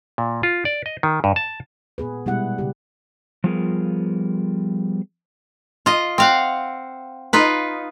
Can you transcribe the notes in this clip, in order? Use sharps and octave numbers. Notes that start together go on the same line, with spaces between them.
A#2
F4
D5
D#5
D#3
G2
A5
A#2 B3 G#4 B4
B2 G3 G#3 B3 E4 F#5
C#3 G4
F3 G3 B3 F4 G#4 A#4
F4 D#5
C4 F5 F#5
D#4 F4 B4